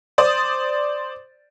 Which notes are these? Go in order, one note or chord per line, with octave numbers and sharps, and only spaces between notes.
C5 D5 D#6 A6